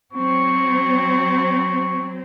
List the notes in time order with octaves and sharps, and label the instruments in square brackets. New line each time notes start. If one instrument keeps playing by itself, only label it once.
[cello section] F#3 C4 [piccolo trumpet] C#6